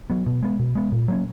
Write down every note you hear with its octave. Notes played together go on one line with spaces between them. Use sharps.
F#3 B3
B2
G#3 B3
B2
G#3 B3
A#2
F#3 A#3 C#4